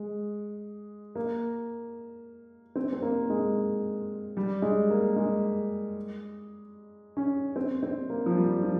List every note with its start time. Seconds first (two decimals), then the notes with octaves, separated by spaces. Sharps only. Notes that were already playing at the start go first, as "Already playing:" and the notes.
Already playing: G#3
1.15 A#3
2.75 C4
2.93 C4
3.02 A#3
3.30 G#3
4.37 G3
4.62 G#3
4.90 A#3
5.16 G#3
7.17 C#4
7.56 C4
7.83 C4
8.10 A#3
8.26 F3
8.37 G3
8.63 F3